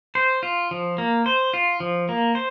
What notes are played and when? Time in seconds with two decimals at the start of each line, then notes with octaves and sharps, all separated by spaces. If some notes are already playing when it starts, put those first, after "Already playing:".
0.15 C5
0.43 F4
0.71 F3
0.98 A#3
1.26 C5
1.54 F4
1.80 F3
2.09 A#3
2.35 C5